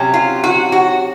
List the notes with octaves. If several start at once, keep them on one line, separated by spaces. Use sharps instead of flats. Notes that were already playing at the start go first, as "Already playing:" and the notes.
Already playing: C3 F#3 C#4
F4
F#4
F#4